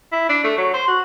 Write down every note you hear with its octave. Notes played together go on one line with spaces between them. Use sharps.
E4
D4
A3
F#3
C5
F#4